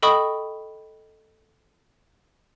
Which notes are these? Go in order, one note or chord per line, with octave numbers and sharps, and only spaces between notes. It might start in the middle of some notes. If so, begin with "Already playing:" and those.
A4 D#5 G5 B5 C#6 D#6